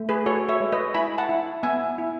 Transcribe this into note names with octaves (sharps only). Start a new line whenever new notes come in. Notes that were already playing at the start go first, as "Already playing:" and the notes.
Already playing: A3
G#4 B4
F#4 A4 C#5
C#5 E5
G#3
B4 D#5
E4 G#5 B5
F#5 A5
E4
B3 E5 G#5
E4